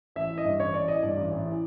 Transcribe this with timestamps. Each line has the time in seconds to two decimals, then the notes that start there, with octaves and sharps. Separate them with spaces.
0.16 A1 E5
0.31 E3
0.38 D#5
0.45 G2
0.59 A1 C#5
0.74 A1 D5
0.88 E3 D#5
1.03 G2 D5
1.17 A1
1.31 A1
1.46 E3